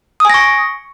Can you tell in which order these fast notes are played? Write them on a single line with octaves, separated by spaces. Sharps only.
D#6 G#5 A#6 C#6